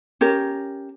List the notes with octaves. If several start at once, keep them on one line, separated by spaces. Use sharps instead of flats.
C#4 G4 A#4